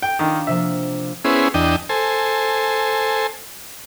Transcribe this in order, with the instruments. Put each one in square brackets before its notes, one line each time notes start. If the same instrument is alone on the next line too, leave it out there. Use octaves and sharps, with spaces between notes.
[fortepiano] G5
[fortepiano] D#3 [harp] D4 F4
[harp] C3 F3 A#3 [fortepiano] E5
[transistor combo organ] B3 C#4 E4 G#4 C5
E2 D4 D#5 G5
A4 C5 G#5